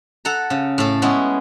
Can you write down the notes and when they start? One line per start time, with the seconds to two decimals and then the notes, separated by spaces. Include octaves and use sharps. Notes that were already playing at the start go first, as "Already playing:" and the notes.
0.25 A4 F#5 A#5
0.50 C#3
0.78 A2 A4
1.02 G#3 B3 C#4 E4